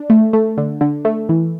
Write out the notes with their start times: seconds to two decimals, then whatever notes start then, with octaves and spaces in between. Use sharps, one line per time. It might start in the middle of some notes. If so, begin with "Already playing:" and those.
Already playing: D4
0.10 A3
0.33 A3
0.57 D3
0.81 D3
1.05 A3
1.29 E3